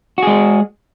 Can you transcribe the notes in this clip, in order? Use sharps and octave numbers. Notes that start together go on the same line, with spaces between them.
G#3 F#4 G#4